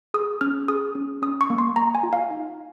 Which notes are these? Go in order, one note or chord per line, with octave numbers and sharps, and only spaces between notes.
G#4 D#6
C#4 F6
G#4 D#6
C#4
C#4 D#6
C#6
A#3
C6
A#3 A#5
G#5
F4
F5
D#4